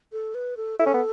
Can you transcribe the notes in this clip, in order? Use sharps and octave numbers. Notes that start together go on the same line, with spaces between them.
A4
B4
A4
E4 A4
C#4
B3